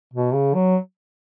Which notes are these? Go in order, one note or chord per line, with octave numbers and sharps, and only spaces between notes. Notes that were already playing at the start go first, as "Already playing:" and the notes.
B2
C#3
F#3